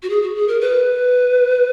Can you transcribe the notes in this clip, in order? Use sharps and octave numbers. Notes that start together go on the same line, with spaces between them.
F#4
G#4
F#4
G#4
A#4
B4